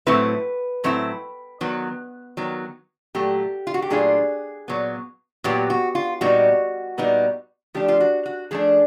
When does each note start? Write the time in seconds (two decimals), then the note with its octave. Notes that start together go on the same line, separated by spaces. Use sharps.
0.06 A2 F#3 A3 C4 E4 B4
0.84 A2 F#3 A3 C4 E4
1.61 D#3 F#3 B3
2.37 D#3 F#3 B3
3.14 A#2 F#3 A3 G4
3.67 F4
3.74 F#4
3.82 G4
3.90 A#2 F#3 A3 D4 F4 G#4
4.68 A#2 F#3 B3
5.44 A#2 F#3 B3 G4
5.70 F#4
5.95 F4
6.21 A#2 G3 B3 D#4 F#4
6.98 A#2 G3 B3 D#4
7.74 F3 A3 D4 G4
7.88 F4
8.00 F#4
8.26 F#4
8.51 F3 A3 D4 G#4